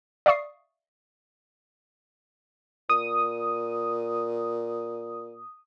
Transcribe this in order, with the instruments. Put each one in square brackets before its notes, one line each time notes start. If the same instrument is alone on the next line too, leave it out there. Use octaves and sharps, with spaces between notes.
[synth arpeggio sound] D5 E5 F5 C#6 D#6 C7
[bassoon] A#2 [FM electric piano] D#6